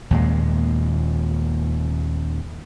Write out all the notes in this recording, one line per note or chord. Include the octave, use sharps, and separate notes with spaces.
D#2 A#2 G#3